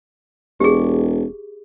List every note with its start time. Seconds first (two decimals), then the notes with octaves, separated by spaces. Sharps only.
0.60 E1 G4 G#4